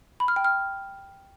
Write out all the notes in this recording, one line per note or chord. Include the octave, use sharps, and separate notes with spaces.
B5
F6
G5
F6